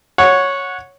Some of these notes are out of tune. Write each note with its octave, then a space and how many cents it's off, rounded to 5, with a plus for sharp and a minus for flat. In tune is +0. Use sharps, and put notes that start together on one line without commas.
C#5 +0 F#5 -15